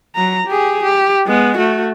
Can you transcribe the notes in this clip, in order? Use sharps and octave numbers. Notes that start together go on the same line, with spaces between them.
F#3 A#5
G4 G#4
G4
G#3 B3
A3 F#4